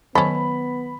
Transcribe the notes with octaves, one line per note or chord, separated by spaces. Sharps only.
D#3 F#3 B3 C#4 A4 C5 B5